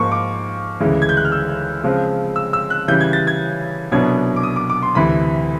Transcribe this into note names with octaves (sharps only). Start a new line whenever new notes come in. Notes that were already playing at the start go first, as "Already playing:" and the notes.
Already playing: G#2 F3 A#3 C#6
D6
D2 C#3 E3 G#3
G#6
G6
F#6
F6
E6
C#3 F3 G#3 C4
E6
E6
F#6
C#3 E3 G3 G6
G#6
A6
G#6
C2 B2 F#3 B3 D4 G#6
D6
D#6
D6
D6
C6
D2 C3 E3 B5